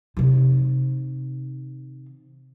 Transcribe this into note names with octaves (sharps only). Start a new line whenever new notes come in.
C3 D#3